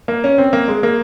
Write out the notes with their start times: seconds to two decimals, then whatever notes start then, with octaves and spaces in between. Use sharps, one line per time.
0.08 A#3
0.24 C#4
0.38 C4
0.53 A#3
0.68 G#3
0.83 A#3